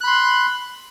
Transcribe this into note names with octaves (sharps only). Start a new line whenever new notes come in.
B5 C6 F#6